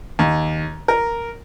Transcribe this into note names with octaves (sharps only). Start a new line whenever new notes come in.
D#2
A#4